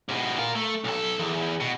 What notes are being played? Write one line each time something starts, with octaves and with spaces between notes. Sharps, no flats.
G#2 B2
F4 A#4
A3
B1 A4
E2
B2